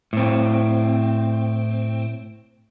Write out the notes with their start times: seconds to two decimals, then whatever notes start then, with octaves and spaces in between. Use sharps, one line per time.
0.13 A2 C4